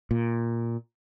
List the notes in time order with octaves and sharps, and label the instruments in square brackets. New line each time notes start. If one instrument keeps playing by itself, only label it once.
[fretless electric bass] A#2